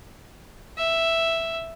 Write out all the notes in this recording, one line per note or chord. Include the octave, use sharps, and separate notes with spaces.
E5